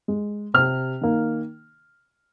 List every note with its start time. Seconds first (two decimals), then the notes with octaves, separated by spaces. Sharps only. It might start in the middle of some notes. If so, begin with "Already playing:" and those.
0.08 G#3
0.54 C3 F6
1.01 D#3 A#3